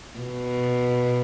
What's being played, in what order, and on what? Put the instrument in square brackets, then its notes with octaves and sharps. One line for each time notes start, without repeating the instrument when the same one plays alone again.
[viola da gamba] B2